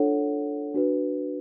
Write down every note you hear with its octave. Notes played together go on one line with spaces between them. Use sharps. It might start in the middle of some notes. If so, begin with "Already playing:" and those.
Already playing: D4 F4 A4 C#5 F#5
D4 F#4 B4